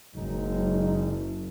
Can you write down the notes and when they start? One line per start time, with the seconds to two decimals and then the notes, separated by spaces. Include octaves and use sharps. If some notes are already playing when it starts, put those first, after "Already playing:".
0.16 F#1 F#3 G#3 D#4